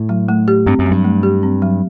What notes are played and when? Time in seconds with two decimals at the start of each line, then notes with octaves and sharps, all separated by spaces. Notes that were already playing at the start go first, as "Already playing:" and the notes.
Already playing: A2
0.09 F#3
0.28 A3
0.48 G4
0.66 G2 C4
0.79 F#2
0.86 F#3
0.91 G2
1.04 A3
1.23 G4
1.43 C4
1.62 F#3